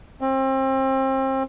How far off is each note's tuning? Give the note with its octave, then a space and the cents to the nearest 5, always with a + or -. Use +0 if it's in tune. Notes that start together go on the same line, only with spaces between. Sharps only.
C4 +30